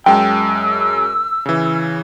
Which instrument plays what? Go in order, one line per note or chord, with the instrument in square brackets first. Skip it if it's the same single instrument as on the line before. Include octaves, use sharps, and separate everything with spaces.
[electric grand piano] F#2 G#3 A5 [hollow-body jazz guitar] G5 [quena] E6
[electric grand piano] C#3 E3